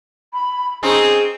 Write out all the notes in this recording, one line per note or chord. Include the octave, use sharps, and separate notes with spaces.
B5
C4 C#4 D#4 G#4